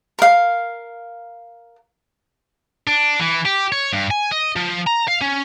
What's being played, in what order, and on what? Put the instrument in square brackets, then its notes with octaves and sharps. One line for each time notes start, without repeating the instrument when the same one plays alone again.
[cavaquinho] A#4 F5
[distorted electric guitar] D4
E3
G4
C#5
G2
G#5
D#5
F3
A#5
F5
C#4